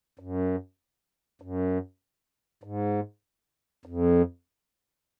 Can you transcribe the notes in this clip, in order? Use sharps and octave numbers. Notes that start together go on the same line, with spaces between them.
F#2
F#2
G#2
F2